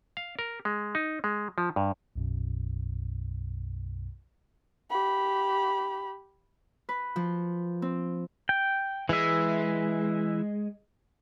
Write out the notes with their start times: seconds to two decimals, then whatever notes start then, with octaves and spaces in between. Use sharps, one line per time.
0.17 F5
0.39 A#4
0.65 G#3
0.95 D#4
1.24 G#3
1.58 F3
1.76 G2
2.16 B1 F#2 B2
4.90 G4 B5
6.89 B4
7.16 F3
7.82 C4
8.49 G5
9.09 E3 G#3 E5